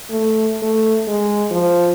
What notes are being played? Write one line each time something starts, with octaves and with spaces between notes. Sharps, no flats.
A3
A3
G#3
F3